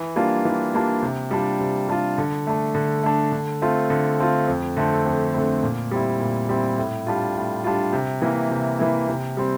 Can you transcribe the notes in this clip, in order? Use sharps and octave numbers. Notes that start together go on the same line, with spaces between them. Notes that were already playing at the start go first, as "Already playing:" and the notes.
Already playing: E3
G3 A#3 D4 F4
E3
G3 A#3 D4 F4
C3
G3 D4 F4
C3
G3 D4 F4
D3
A3 D4
D3
A3 D4
D3
A3 C4 F4
D3
A3 C4 F4
F2
D3 A3 C4
F2
D3 A3 C4
A#2
G3 C4 E4
A#2
G3 C4 E4
A2
G3 D4 F4
A2
G3 D4 F4
C3
E3 A#3 E4
C3
E3 A#3 E4
C3
G3 C4